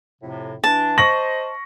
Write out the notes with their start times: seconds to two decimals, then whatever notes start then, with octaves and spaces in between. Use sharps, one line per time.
0.22 F2 A2 C3
0.64 E3 D4 A5
0.98 C5 D#5 C#6 A#6 F#7